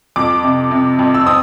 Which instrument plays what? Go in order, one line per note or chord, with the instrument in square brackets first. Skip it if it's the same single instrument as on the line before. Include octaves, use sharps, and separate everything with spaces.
[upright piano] F2 D6
C3
C3
F2
E6
C4 D#6